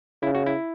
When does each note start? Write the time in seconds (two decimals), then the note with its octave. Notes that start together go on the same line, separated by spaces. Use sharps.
0.22 C#3 E4
0.35 F#4
0.46 E4